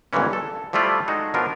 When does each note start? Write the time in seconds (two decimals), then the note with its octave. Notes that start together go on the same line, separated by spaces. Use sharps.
0.13 G1 C#2 G2 A#2 E3 C#4
0.33 A4
0.73 F3 G3 A3 E4 F4 D5
1.08 G#3 D#4 F#4 A4
1.34 B2 F3 D4 E4 F4 A#4